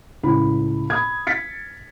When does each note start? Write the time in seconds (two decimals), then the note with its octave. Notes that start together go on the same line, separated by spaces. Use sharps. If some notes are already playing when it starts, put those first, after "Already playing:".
0.23 C#2 A2 B5
0.90 B5 D#6 G#6
1.27 A6 B6 C#7